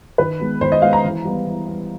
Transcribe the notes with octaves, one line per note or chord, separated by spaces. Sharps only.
D#3 B4
G#3 B3
D#3 C5
D#5
G#3 B3 F5
A#5
E3
G3 B3
E3
G3 B3